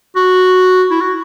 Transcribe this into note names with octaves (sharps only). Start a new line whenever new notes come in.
F#4
E4
F#4